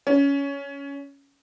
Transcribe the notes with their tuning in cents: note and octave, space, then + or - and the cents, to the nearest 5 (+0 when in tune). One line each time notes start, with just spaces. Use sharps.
C#4 +15